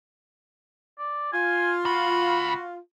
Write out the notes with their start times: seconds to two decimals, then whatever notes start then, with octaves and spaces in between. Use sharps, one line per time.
0.99 D5
1.33 F4 G#5
1.85 C#2 F#4 B5